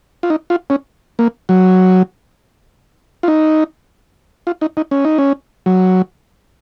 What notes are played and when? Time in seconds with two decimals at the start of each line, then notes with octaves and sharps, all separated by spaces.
0.23 F4
0.30 D#4
0.50 F4
0.70 C#4
1.19 A#3
1.49 F#3
3.23 F4
3.28 D#4
4.47 F4
4.61 D#4
4.77 D#4
4.91 C#4
5.05 D#4
5.18 C#4
5.66 F#3